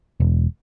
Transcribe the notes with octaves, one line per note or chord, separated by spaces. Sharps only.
E1